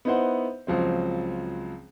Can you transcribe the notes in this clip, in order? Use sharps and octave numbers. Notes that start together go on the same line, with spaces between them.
B3 D#4 E4 C5 F#5
C#2 F3 F#3 C4